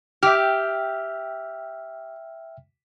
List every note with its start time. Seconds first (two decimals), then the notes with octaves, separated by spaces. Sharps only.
0.23 G4 E5 G5 F6